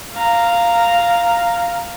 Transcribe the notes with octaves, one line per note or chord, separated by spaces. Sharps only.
F5 A#5